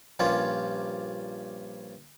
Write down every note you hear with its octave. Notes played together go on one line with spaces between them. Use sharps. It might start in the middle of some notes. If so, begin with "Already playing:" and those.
A#1 G2 G3 C#4 F4